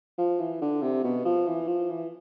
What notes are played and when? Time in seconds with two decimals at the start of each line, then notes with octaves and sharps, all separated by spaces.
0.18 F3
0.39 E3
0.61 D3
0.83 C3
1.04 B2
1.25 F3
1.47 E3
1.68 F3
1.89 E3